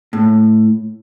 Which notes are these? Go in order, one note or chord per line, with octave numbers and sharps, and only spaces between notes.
A2